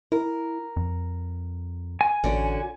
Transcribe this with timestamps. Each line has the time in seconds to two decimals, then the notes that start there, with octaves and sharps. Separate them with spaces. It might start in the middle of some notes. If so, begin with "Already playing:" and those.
0.12 E4 A#4
0.76 F2
2.01 G#5
2.24 A1 D3 C#4 F#4